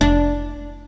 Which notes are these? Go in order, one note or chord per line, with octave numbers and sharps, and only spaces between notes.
F1 D4